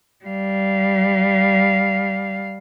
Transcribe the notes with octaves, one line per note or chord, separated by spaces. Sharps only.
G3 F5